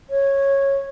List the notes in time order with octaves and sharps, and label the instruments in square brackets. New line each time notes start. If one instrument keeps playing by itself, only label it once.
[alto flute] C#5